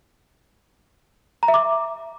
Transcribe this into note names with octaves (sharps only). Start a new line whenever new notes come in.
A#5
E5
D6